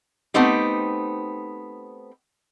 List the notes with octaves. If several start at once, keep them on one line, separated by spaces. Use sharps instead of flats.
A3 B3 C4 D#4 G4